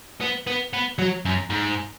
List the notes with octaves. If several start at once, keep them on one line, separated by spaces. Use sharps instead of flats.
B3
B3
B3
F#3
F#2
G#2